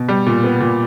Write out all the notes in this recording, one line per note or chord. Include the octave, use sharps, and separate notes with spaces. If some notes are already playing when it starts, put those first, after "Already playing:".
Already playing: B2
G3
A#2
B3
A#2